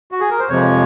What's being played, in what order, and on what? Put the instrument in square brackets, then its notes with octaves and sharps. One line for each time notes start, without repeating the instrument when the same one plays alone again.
[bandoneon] F#4
G#4
A#4
C5
F2 C3 F3 G#3 C#5